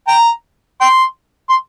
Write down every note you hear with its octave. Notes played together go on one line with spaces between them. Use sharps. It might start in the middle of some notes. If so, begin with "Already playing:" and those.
G5 A#5
G5 C6
C6